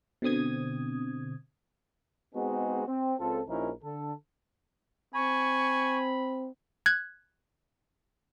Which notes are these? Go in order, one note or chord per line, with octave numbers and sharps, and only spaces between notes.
B2 D3 C4 D#6 G#6
G#3 B3 C4 D#4 F#4 G#4
C4
C#2 C4 F4 A4
A#1 F3 C#4 D#4 E4 A#4
D3 A4
C4 G#5 B5 C#6
F#6 G#6